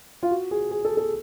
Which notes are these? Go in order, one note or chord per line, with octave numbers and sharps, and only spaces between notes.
F4
F#4
G#4
G#4
A4
A4